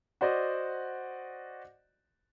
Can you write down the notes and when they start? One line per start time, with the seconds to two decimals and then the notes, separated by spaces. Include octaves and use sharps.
0.21 F#4 C5 D5 D#5